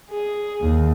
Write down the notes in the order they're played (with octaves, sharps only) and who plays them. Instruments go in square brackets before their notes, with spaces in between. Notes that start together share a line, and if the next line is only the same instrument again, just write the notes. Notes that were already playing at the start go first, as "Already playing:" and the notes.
[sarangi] G#4
[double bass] D#2